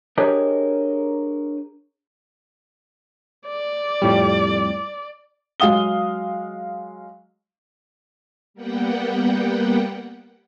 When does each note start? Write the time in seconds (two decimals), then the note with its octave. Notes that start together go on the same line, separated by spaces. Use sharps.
0.18 D4 G4 G#4 A#4 C#5 D#5
3.48 D5
4.02 F2 A2 G3
5.60 F#3 G#3 F5 D#6 G7
8.54 G3 A#3 B3 F#5 G5